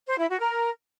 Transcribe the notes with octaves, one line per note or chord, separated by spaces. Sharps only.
C5
E4
F#4
A#4